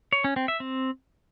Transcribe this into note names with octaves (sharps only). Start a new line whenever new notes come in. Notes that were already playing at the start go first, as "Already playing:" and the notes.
C#5
C#4
C4
E5
C4